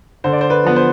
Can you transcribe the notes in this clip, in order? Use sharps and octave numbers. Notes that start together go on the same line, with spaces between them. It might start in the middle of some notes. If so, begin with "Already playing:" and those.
D3 C5
D5
C5
B4
F3 B3
C5